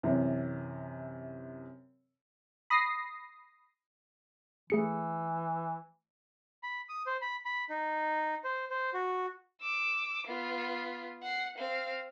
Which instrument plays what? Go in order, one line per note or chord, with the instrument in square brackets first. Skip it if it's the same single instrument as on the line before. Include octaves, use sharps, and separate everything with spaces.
[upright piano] F#2 C3 E3
[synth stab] B5 D#6 A#6 C7
[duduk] E3 [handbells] A3 G#4 C#7
[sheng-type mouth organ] B5
D#6
C5
B5
B5
D#4
C5
C5
F#4
[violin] D6 E6
B3 F4
F#5 C7
C4 F5